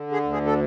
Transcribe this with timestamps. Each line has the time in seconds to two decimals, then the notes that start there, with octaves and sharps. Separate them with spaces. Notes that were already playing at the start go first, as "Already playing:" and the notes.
Already playing: D3
0.12 G#4
0.23 D2
0.33 G#4
0.46 A4